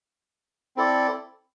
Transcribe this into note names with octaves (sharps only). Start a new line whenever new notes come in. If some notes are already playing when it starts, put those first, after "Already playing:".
C4 E4 A4 D5